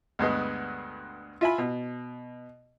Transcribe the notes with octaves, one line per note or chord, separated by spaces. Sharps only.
D2 G2 G#3 B3
F4 E5 G#5 B5
B2